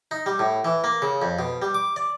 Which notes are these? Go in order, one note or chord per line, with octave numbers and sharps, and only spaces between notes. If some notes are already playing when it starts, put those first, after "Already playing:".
D#4
G3
A2
E3
A#3
C#3
F2
B2
G3
D6
D5